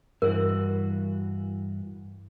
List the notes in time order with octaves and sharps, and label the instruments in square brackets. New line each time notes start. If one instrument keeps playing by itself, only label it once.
[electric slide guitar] G2 E3 F#4 [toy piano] A#4